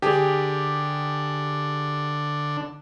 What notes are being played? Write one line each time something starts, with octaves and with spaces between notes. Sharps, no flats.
D3 D4 G4 G#4